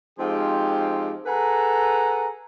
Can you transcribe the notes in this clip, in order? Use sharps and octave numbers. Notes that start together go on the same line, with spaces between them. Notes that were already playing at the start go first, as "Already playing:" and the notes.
F3 G#3 C4 D#4 G4 F5
G#4 A4 B4 F#5 A#5